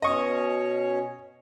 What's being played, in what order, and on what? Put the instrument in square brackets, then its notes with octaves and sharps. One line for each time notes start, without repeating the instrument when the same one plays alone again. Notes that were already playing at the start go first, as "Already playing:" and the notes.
[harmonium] B2 C#4 C#5 [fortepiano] D#5 C#6